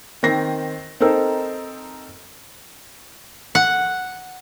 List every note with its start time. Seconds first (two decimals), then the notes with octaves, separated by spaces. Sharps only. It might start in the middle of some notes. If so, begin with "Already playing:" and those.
0.23 D#3 C4 A#6 C7
1.00 C4 D#4 A4 A#4 C5
3.55 F#5